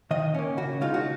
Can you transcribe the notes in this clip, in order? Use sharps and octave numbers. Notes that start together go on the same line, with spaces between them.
D#3 D#5
A#3 C#4
C#3 F#4
G#3 D#4 F4
F#4